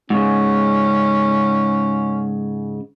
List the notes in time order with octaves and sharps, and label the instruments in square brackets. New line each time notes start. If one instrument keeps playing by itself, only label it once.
[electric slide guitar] G#2 C#3 [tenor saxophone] C#4